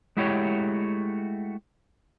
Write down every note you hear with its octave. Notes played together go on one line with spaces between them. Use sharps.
G#3 A3 E4 F#4 G4 C#5